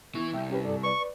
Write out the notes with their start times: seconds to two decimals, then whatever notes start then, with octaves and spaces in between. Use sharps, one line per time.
0.15 E3 B3 E4 C#6
0.33 C2 E5 G5
0.50 C#4 G4 B4
0.65 G2 A4 D5
0.83 B4 D5 C#6